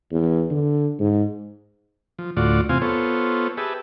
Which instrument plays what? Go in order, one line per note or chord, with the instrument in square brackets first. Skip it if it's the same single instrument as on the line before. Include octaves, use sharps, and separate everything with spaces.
[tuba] E2
D3
G#2
[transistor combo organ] F3
D2 A2 F4 F#4 D5
E2 C3 C4 F4 F5 G#5
B3 F4 A4 C5 C#5
G4 G#4 B4 E5 A5